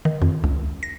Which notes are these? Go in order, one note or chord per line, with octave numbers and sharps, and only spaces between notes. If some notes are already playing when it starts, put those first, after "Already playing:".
D#3
F2
C#2
A#6